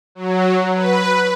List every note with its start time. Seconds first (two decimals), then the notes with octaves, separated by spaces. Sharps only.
0.15 F#3
0.75 B4